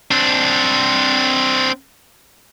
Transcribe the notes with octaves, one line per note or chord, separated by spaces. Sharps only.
C4 D4